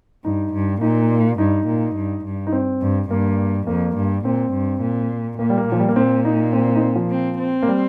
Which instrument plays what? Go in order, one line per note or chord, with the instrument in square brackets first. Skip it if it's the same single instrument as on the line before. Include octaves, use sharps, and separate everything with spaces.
[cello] G2 [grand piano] D#4
[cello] G2
[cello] A#2 [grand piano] D#4
[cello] G2 [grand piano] D#4
[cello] A#2
G2
G2
[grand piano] D#4
C4
[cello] G2
[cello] G2 [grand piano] A#3
[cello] F2 [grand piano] A#3
[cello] G2
[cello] A#2 [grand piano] C4
[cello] G2
A#2
[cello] A#2 [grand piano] A#3
[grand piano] G3
A#3
[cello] A#2 [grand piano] F3
[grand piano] G3
A#3
[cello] A#2 [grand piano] C4
[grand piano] D#4
C4
C4
D#4
C4
F3
[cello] C4
C4
[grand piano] A#3
G3